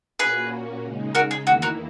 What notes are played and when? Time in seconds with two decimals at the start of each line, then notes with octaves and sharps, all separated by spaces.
0.19 A#2 A#3 C#4 F#4 G#4 B4
0.83 C#3 G#3 D#4
1.15 F#4 A#4
1.31 G#4
1.47 E2 D#3 A#3 E4 F#4
1.62 F#4 A#4